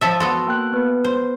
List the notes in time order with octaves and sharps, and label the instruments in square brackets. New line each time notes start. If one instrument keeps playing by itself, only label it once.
[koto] F3 A4 E5
[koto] B3 F#4 A4 [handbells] C6
[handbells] A#3 G5 F#6
B3 B4
[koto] C5